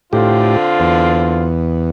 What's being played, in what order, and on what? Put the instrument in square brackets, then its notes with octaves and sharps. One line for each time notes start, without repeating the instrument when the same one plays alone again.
[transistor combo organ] A2 G4 [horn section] D3 C4 F4
[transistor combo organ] E2